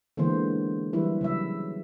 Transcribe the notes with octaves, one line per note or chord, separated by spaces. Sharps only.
D3 E3 G#3 A#3 B3 C5
E3 F#3 G3 E4 B4
C#3 F#3 E5